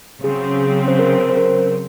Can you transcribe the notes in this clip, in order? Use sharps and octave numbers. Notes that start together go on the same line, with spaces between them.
C#3 F#3 C4 G#4
C5
A#4
C5
A#4